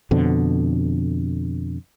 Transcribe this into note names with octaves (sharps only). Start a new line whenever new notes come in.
F2 B2 D3